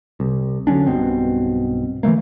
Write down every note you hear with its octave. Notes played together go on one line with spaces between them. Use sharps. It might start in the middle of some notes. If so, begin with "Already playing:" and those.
C2
D3 F#3 C#4 D4
B1 G2 B2 C4
E3 F#3 A3 A#3